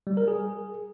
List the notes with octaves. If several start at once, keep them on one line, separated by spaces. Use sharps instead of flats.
G3
A#4
G#4